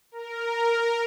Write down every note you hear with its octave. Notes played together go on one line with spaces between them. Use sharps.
A#4